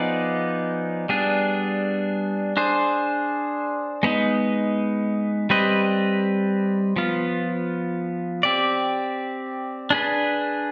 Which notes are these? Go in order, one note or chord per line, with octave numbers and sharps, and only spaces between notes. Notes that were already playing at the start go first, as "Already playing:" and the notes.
Already playing: F3 B3 D#4 G#4 D5
G3 B3 D4 G#4
D4 G#4 C5
G#3 B3 D#4
G3 C4 G4 B4 D#5
F3 B3 F4
C4 G4 D5
D4 G#4 B4